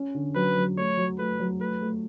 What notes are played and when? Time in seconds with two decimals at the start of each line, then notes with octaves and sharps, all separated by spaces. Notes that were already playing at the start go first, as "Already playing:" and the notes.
Already playing: C#4
0.14 D3
0.35 F#3 B4
0.56 F#3
0.77 A3 C#5
0.97 F#3
1.18 A3 B4
1.40 F#3
1.59 A3 B4
1.81 A3